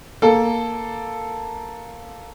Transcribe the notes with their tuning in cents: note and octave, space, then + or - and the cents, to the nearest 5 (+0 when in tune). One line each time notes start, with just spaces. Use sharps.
A#3 +0 A4 +0